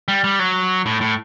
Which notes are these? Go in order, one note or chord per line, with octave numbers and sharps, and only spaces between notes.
G3
G3
F#3
A2
A2